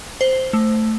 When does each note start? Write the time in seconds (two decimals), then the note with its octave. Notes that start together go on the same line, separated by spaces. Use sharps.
0.21 C5
0.53 A3